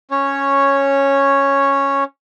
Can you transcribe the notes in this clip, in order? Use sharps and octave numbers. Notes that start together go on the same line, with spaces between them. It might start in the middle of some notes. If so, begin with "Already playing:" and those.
C#4 C#5